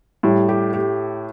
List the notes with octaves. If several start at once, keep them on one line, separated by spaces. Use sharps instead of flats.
A2 G3
G4
G4